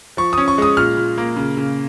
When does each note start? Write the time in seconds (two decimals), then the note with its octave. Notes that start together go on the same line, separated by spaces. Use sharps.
0.17 F3 C#6
0.33 C#4 D#6
0.48 C#6
0.58 G#3 D#6
0.77 A#2 F6
0.97 A#2
1.18 A#3
1.36 C#3
1.57 C#3